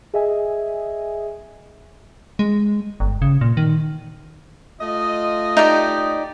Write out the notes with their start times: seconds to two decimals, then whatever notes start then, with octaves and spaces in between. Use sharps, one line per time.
0.14 G#4 D#5 E5 G#5
2.39 G#3
3.00 G1
3.22 C#3
3.41 A#2
3.57 D#3
4.81 A3 F4 D#5
5.57 D#4 G4 D5